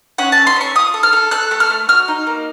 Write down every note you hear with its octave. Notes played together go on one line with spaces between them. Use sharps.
C#4 F#5
A5
A4
C6
C#4 C#6
F4 D#6
A4
F6
A4
A4 F#6
A3
F6
A3
F#4 F6
D#4
A#3